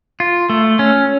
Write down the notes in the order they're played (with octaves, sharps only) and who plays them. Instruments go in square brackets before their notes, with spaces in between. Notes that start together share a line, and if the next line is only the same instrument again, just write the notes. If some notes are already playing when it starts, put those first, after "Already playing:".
[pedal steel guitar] F4
A3
C#4